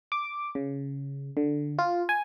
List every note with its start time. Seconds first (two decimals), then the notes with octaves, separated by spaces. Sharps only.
0.12 D6
0.55 C#3
1.37 D3
1.79 F4
2.09 G#5